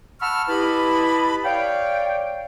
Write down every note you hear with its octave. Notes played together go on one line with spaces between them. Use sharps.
F#5 A5 B5 C#6 E6 F6
E4 G4 B4 D#5 A5 B5
C#5 D5 F5 G5